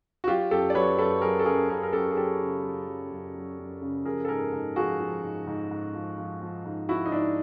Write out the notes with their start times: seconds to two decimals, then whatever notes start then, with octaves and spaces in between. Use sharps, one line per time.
0.24 F#4
0.28 F#3 F4 G4
0.51 F#2 G4 A4
0.70 D5
0.75 F#3 B4 C#5
0.98 F#2 A4 B4
1.22 F#3 G#4 A#4
1.39 A4
1.46 F#2 G#4 A#4
1.69 F#2 G#4 A#4
1.83 A#4
1.93 F#2 G4 A4
2.11 G#4
2.16 F#3 G4 A4
2.40 C#3
2.64 F#2
2.87 F#3
3.11 F#2
3.35 F#3
3.59 F#2
3.82 C#3
4.05 F3 G#4 A#4
4.25 A4
4.29 G#2 G#4 A#4
4.53 G#2
4.76 F3 F#4 G#4
5.00 F3
5.24 G#2
5.47 G#2
5.71 G#2
5.94 F3
6.18 F3
6.41 F3
6.65 G#2
6.89 F3 E4 F#4
7.06 D#4
7.12 G#2 D4 E4